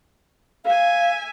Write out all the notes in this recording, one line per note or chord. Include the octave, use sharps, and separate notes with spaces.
E5 F5 G#5